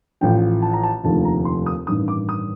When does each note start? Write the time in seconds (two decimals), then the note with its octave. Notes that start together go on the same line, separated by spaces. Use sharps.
0.21 A1 A2 F3 G5
0.62 A5
0.73 A#5
0.83 A5
1.04 F1 D#2 D3 F3 A3 A5
1.25 A#5
1.45 C6
1.66 D#6
1.87 A1 G2 D#3 D#6
2.08 D6
2.29 D#6